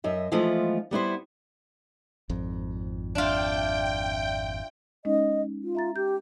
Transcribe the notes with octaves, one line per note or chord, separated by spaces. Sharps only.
F#2 D#5 E5
E3 F3 G#3 A3 B3 F4
G3 B3 E4 C5
G#1 F2
D4 F4 D5 E5 G5
G#3 C#4 D#4 D#5
F4
E5 A#5 A6
G4 G6